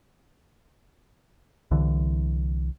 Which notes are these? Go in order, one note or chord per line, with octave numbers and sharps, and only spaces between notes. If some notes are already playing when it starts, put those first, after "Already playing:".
C2 D3 E3